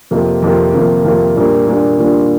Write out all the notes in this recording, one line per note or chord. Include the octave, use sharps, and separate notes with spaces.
F2 C3 A#3 F4
F2 C3 A#3 F4
F2 C3 A#3 F4
F2 C3 A#3 F4
A#2 G3 A#3 D4 F4
A#2 G3 A#3 D4 F4
A#2 G3 A#3 D4 F4